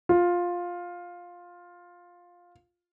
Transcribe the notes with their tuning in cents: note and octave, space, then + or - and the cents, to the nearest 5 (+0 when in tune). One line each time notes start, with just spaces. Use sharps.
F4 +10